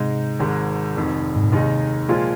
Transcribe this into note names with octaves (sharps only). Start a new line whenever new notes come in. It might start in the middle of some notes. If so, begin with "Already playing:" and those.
Already playing: G#2 C3 G#3 D#4
G#1 G#2 G#3
F1 F2 D#3
G#2
A#2
D#2 C3 D#3 G#3 D#4
A#2 F3 G#3 F4